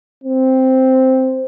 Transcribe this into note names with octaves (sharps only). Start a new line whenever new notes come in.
C4